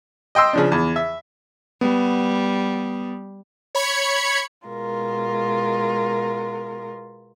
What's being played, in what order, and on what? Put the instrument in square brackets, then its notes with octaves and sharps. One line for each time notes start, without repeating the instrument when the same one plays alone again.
[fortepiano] D#5 G5 C6 E6
C#3 F3 D4
E2
E5
[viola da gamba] G3 [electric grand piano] B3
[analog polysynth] C#5 B5 G#6 C#7
[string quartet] B2 G#3 F4 A#4